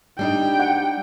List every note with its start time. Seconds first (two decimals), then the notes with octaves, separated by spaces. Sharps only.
0.19 G3 D4 D#4 G5
0.60 G4 F#5